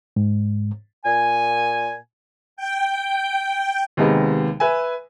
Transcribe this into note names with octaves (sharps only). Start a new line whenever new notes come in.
G#2
A#2 G#5
G5
D#2 C3 G#3 B3 D#4
B4 E5 G#5